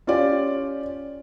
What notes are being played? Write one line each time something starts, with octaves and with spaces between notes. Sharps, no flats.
C#4 F4 G4 D5